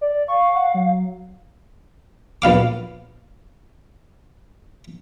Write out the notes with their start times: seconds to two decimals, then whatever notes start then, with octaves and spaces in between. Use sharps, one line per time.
0.01 D5
0.28 F5 C#6
0.55 F#5
0.74 F#3
2.42 A#1 B3 F5 D6